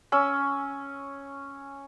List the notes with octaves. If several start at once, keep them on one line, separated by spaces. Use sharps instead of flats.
C#4 E6